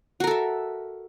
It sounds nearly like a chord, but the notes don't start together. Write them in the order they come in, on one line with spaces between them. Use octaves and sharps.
F#4 A#4 A4 E5